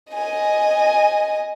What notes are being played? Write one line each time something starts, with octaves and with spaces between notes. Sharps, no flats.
D#5 G#5